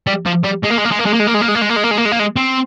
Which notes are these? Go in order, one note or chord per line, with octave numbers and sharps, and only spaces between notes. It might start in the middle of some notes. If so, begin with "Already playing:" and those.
G3
F3
G3
G#3
A#3
G#3
A#3
G#3
A#3
G#3
A#3
G#3
A#3
G#3
A#3
G#3
A#3
G#3
A#3
G#3
A#3
G#3
A#3
G#3
A#3
G#3
C4